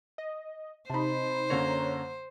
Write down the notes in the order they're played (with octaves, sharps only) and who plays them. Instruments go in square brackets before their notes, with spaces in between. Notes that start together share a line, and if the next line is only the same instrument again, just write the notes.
[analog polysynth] D#5
[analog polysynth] C3 D#4 [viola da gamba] C5 [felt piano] A5 B5
[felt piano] F#2 D3 A#3 [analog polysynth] C#5 A#5